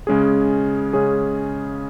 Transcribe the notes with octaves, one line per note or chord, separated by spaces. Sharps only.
C#3 G#3 C#4 G#4
C#3 G#3 C#4 G#4